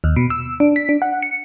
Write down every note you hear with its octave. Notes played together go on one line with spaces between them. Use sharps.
D#2
B2
E6
D4
B6
D4
F#5
C#7